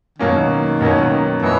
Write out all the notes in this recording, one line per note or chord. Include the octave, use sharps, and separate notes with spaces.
B2 D#3 F#3 A#3 C#4
B2 F#3 A#3 C#4
B2 E3 F#3